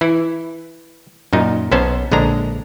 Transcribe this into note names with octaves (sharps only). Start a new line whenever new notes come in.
E3 E4
F#2 A#2 D#4
B1 B3 C#4 C5 A5
A#1 D3 G#3 D4 A#5